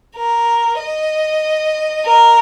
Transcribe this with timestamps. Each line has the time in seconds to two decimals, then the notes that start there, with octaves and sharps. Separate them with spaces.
0.16 A#4
0.80 D#5
2.05 A#4